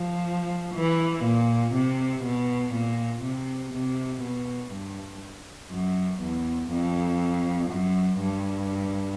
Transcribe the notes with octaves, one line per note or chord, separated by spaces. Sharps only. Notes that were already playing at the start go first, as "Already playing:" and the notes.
Already playing: F3
E3
A#2
C3
B2
A#2
C3
C3
B2
G2
F#2
E2
F2
F#2
G2